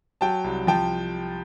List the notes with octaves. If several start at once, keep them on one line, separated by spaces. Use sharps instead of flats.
F#3 G5 A5
C2
F3 G5 A5